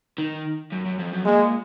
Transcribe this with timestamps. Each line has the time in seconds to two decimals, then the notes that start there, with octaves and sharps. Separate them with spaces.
0.18 D#3
0.72 F#2
0.85 F#2
0.99 F2
1.13 F#2
1.26 A#2 G#3